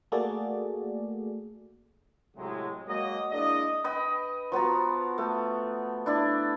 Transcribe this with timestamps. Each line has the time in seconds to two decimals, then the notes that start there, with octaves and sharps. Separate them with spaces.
0.12 A3 A#3 F#4 G#4 A4 D5
2.37 A2 C3 F#3 G#3
2.88 F#3 G#3 A#3 F#4 D#5
3.32 G#3 A#3 D4 E4 D5 D#5
3.84 B4 D#5 G5
4.52 F3 B3 F#4 A#5
5.18 A3
6.06 D4 E4 D5